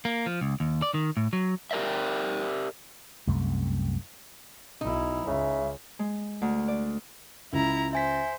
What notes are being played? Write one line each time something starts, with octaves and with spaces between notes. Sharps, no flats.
A#3
F3
C#2
D#2
D5
D#3
A2
F#3
G4 A#4 D5 E5
C2 F#2 C3 A3
B1 D#4 E4
C#2 C#3 E5
G#3
D2
D5
C#2 E4 A#5
C5 E5 G#5 B6